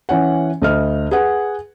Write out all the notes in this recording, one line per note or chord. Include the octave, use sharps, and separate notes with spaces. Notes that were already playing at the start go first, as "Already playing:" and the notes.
E3 C#4 F#5
D2 D#5 F6
G#4 B4 F#5